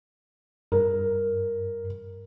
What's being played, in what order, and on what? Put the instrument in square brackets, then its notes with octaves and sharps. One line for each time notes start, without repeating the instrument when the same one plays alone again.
[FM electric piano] G2 [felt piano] A#4